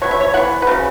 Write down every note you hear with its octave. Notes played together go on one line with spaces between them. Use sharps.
B2 B3 C#5
E5
C#5
E3 B3 F#5
B4
C#3 F#3 C#4